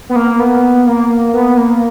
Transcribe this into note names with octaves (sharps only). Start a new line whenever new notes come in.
B3
A#3
B3
A#3
B3
A#3